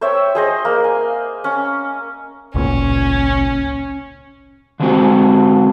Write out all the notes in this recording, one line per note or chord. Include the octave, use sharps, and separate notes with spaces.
C5 C#5 E5 G5
G#4 C5 D#5
A#3
G#5
C#4
G#1 C#2 A#2 C#4
D3 F#3 G#3 C4 F#4 G4